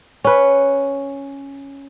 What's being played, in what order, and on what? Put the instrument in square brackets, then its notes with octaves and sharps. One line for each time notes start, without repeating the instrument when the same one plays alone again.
[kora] C#4 B4